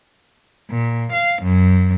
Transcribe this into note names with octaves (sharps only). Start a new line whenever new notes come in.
A#2
F5
F#2